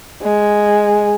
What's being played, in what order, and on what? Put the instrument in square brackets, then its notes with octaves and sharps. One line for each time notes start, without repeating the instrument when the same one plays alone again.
[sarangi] G#3